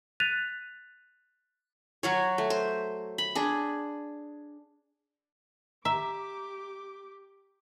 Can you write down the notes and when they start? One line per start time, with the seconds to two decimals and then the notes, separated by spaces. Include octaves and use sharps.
0.20 F#6 A6 B6 D#7 F7
2.03 F#3 F#4 C#5
2.38 A3
2.50 C5
3.18 B5
3.35 D4 G#4
5.85 G4 E5 A#5 D6